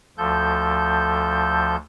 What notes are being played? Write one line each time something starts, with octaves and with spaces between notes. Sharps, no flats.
D2 F3 A4 G6